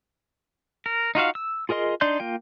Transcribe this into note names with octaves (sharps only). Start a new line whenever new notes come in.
A#4
D#4 F4 F#4 F5
E6
F4 G#4 A#4 D#5 C6
D4 D#4 D5 C6 G6
A#3 F4 G5